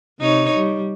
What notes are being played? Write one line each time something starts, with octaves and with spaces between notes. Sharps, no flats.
C3 D#4 C#5
G3